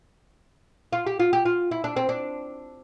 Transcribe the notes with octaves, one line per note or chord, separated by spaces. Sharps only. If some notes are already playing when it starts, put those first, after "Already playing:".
F4
G4
F4
G4
F4
E4
D4
C4
D4